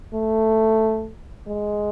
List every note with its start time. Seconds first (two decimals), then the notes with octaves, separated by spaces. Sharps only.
0.14 A3
1.48 G#3